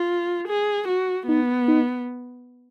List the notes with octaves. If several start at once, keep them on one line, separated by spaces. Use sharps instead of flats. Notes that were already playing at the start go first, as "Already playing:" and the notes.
Already playing: F4
G#4
F#4
B3 D#4
D#4